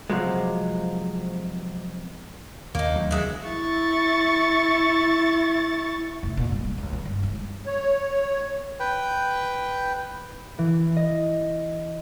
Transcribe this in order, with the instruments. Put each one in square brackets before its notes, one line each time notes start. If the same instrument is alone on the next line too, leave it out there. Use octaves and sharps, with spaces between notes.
[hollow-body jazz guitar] C3 F3 F#3 G#3
[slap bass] D#2 [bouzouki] A#3 D#4
[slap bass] D2 F#3
[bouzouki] E3 G#3 E5
[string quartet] E4 C#6 A6
[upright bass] F1
A#2
G2
G3
C#2
D3
G2
E3
G#3
[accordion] C#5
[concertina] B4 G5
[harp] E3
D#5